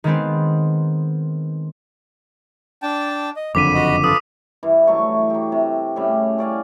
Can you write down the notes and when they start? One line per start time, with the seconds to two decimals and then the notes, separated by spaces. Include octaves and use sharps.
0.04 D#3 G#3 B3 C4
2.82 D4 G5 A5
3.36 D#5
3.55 F#1 F2 D3 B5 D6 B6 D#7
3.74 F#4 D#5 B5
4.04 F4 A4 B4 D#6
4.63 G2 E3
4.87 E3 F#3 A3 C#6
5.30 F#3 G4
5.52 C3
5.96 A2 C#3 G3
6.38 C#4 D5 F5 G#5